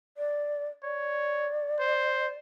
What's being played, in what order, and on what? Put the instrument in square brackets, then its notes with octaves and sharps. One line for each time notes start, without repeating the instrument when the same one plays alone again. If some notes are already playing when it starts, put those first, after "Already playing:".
[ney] D5
[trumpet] C#5 [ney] D5
[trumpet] C5